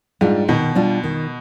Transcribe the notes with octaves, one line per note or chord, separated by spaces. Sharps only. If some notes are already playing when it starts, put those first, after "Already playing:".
G#2 G3 D4 F4
B2 D#3
G3 D4 F4
D#3